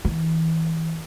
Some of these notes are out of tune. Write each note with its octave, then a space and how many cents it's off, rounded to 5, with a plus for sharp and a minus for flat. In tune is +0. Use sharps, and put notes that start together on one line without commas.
E3 -25